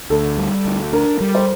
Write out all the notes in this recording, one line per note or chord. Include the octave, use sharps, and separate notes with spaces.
D2 A4
G3
D2
D4 A#4
G3
C5